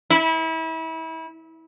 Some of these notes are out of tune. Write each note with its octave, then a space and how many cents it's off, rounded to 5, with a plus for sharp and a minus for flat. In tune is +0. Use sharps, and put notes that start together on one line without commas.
E4 -30